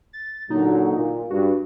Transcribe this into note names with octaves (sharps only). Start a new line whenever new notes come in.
A6
A#2 D3 F#3 D#4
A#2
G2 F#4